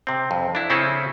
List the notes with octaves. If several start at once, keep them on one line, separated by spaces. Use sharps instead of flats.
C3 C4
F2
D4 E4
C#3 C4 C#4 E4 G#4 A4